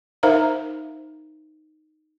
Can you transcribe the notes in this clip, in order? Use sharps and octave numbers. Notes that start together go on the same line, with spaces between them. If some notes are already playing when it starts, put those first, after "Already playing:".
D#4 A#4 C5 E5 F5 A#5